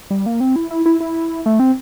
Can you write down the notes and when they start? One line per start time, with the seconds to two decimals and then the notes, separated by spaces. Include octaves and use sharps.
0.10 G3
0.26 A#3
0.40 C4
0.56 E4
0.71 E4
0.86 E4
1.00 E4
1.46 A3
1.60 C4